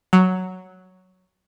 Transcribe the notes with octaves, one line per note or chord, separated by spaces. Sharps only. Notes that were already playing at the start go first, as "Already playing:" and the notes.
F#3